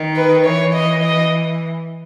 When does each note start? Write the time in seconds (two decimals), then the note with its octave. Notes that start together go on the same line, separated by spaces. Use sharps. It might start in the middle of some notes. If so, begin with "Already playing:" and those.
Already playing: D#3
0.16 B4
0.45 E3 C#5
0.74 D#5
1.03 D#5